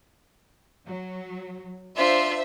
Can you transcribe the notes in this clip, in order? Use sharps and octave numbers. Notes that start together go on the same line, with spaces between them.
F#3
D4 F4 C5 E5